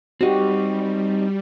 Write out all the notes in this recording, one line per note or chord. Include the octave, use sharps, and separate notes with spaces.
G3 C4 D#4 F#4 G4